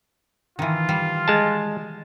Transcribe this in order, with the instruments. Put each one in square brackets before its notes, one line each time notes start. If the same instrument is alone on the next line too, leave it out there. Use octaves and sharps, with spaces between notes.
[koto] D#3 E3 [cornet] F4
[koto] G3
[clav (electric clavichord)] G#3 A5